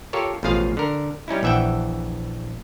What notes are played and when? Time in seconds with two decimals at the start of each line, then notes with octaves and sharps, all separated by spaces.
0.13 F4 G4 A4 A#4 C#5
0.43 A1 B2 F3 F4 G#4 F5
0.77 D3 A#4
1.28 G3 C#4 D#4 E4
1.43 A#1 E3 E5 F#5 G5